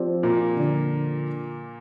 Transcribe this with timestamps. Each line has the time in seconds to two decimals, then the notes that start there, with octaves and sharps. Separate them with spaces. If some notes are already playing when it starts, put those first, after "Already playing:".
Already playing: F3 C4 G4 D5
0.23 A#2 A#3
0.57 D3 F3 D4